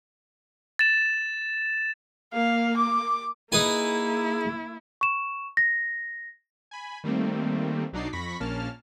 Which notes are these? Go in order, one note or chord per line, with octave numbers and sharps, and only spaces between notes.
A6 E7
A#3 F5
D6
A#3 D#4 E4 G#4 B4 G#5
C#6 E7
A#6
G#5 B5
D#3 G3 A3 A#3 C4
B1 F#3 D4 D#4 D5 C7
F2 B5 C#6 A#6 B6
A#1 A#3 C#4 A5 F6